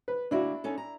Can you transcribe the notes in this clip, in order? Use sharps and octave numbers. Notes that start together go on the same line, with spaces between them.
B4
D2 A#3 D4 E4 F#4
C#4 D#4 A4
A#5